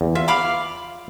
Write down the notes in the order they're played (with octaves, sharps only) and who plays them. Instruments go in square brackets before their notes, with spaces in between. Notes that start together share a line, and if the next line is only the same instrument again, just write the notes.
[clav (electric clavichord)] E2
[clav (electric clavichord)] F4 [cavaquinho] E5
[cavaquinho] F5 B5 D6